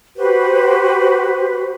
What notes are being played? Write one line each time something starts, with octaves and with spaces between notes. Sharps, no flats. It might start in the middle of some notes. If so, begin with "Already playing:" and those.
F#4 G4 B4 C5